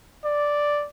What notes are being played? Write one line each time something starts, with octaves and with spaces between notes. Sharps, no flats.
D5